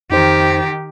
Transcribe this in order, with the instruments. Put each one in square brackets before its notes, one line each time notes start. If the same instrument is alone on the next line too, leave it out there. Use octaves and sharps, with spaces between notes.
[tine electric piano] F2 D#4 C5 [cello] D#3 G4